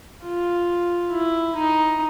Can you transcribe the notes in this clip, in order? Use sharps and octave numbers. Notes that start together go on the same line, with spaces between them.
F4
E4
D#4